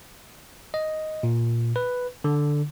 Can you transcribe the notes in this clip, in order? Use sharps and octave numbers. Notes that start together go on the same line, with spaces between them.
D#5
A#2
B4
D3